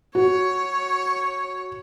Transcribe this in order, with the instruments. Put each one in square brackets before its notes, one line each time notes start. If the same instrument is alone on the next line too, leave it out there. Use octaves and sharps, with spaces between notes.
[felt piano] F#4 [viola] C#5